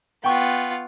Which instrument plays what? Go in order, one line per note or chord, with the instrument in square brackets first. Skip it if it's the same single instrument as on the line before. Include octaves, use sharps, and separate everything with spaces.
[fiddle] B3 F4 [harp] G5 C#6 F#6